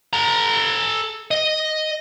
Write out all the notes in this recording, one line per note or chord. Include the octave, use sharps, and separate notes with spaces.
A4 A#5
D#5